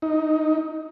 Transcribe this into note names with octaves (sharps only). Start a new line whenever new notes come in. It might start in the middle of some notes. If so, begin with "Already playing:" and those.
D#4